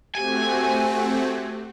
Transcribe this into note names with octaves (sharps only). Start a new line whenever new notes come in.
A3 C4 F#4 G4 G#5